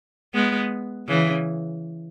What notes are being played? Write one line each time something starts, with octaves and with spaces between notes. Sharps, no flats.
G#3 B3
C#3 E3